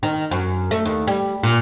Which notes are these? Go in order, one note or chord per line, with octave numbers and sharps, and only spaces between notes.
D#3
F#2
A3
D#2
G3
A#2